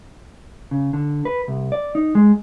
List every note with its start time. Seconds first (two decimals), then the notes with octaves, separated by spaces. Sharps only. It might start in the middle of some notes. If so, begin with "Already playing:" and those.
0.71 C#3
0.93 D3
1.25 B4
1.48 C2
1.72 D5
1.95 D#4
2.15 G#3